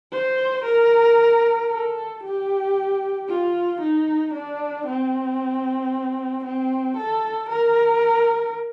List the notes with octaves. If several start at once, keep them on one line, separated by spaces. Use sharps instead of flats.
C5
A#4
A4
G4
F4
D#4
D4
C4
C4
A4
A#4